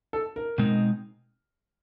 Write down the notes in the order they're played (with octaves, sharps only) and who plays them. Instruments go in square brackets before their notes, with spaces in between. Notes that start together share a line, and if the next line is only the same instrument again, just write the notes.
[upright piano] A4
A#4
[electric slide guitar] B2 G#3 C4 D#4